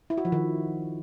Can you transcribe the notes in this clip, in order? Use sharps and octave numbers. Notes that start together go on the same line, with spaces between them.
E4
F#4
F3
D#3